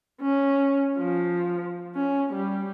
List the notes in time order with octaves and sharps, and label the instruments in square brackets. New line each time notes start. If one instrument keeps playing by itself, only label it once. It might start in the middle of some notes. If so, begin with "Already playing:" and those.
[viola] C#4
F3
C#4
G3